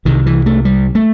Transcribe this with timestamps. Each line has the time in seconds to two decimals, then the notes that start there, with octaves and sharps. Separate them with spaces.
0.05 C2 C3 D#3
0.26 E3
0.46 A3
0.65 G3
0.95 A3